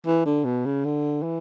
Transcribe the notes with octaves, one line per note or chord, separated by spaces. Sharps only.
E3
D3
B2
C#3
D3
E3